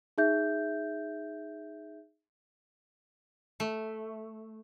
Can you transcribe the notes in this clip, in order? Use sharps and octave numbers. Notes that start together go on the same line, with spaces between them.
D#4 G#4 E5 G6
A3